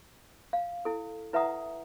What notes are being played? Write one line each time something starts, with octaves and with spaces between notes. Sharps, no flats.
F5
E4 A4
E4 B4 E5 F#5 A#5 D#6